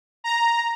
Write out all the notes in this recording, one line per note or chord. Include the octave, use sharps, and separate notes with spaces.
A#5